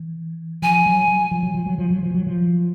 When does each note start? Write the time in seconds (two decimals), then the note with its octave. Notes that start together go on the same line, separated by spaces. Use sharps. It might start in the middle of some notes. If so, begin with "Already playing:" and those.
Already playing: E3
0.62 F3 G#5
0.86 F#3
1.08 F#3
1.31 F3
1.43 F#3
1.54 F3
1.66 F#3
1.78 F3
1.90 F#3
2.03 F3
2.14 F#3
2.27 F3